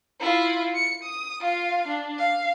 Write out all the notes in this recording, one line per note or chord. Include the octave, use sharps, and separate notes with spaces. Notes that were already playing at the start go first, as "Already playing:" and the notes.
E4 F4
C#7
D#6
F4 F5
D4
F5